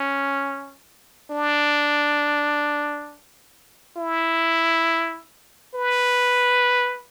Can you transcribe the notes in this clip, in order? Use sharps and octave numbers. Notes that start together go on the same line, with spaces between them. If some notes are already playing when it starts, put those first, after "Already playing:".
Already playing: C#4
D4
E4
B4